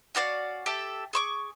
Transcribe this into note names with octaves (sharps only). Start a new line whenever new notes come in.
C#4 F#4 D5 F5
G4 A4 E5
G#4 C#6 D6